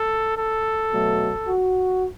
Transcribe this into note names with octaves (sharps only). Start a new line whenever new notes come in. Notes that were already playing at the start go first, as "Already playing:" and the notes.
Already playing: A4
A4
B2 F#3 A3
F#4